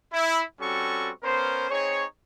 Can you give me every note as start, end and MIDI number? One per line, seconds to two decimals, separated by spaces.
0.13 0.43 64
0.60 1.10 55
0.60 1.10 60
0.60 1.10 61
0.60 1.10 66
0.60 1.10 69
0.60 1.10 85
1.23 1.69 59
1.23 1.69 61
1.23 1.69 70
1.23 1.69 72
1.70 2.04 60
1.70 2.04 63
1.70 2.04 68
1.70 2.04 73